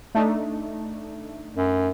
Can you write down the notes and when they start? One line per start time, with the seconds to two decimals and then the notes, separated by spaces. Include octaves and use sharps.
0.15 A3 D4 D#4
1.57 F#2